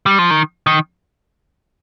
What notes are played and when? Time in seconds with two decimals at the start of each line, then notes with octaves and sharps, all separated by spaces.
0.06 G3
0.19 F3
0.30 D#3
0.67 D#3